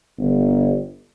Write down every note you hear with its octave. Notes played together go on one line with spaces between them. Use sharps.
G1